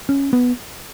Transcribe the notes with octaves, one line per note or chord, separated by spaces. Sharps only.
C#4
B3